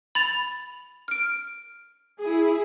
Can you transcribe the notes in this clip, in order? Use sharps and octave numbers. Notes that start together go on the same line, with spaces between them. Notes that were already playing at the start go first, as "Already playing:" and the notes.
B5 A6 F7
F6 D7
E4 G#4